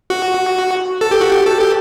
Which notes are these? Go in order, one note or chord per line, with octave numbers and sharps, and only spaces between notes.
F#4
A4
G4
F#4
G4
A4
G4